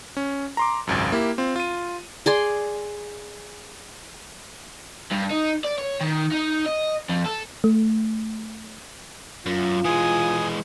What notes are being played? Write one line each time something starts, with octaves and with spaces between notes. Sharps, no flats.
C#4
A#5 C6 D6
G#1 C#2 F#2
A#3 E4 G4
C4 F4
F4 D#7
G#4 D5 C6
G2
D#4
D5
C#5
D#3
D#4
D#5
F2
A4
A3
F#2 F4
E3 G#3 G#5 D#6